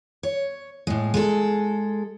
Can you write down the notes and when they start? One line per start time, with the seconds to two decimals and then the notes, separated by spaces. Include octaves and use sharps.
0.23 C#5
0.87 A2 G#3
1.14 G#3 G#4 A4